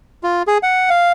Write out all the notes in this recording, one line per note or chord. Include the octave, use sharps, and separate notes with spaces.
F4
G#4
F#5
F5